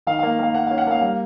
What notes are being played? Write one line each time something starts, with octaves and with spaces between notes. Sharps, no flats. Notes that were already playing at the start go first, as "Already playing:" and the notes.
D#3 F5
F5
A#3
A#3 F5
A#3 F#5
F5
C#4
F#5
A#3 F5
G3 F5